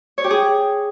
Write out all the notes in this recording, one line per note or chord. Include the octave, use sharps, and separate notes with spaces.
C#5
G4
G#4